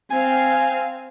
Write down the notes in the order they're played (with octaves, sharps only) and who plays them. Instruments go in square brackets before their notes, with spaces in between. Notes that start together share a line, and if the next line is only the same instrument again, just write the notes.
[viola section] C4 F5 [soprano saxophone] G#5